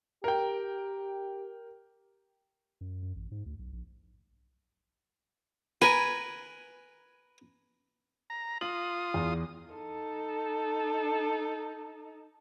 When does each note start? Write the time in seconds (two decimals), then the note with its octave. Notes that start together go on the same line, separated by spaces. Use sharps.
0.24 G4 A#4 G5
2.81 F#2
3.02 F#2
3.16 A1
3.32 G#2
3.46 D2
3.59 B1
3.73 A#1
5.82 A#4 B4 G#5
8.30 A#5
8.61 F4 D#6 F#7
9.14 E2
9.74 D#4 A4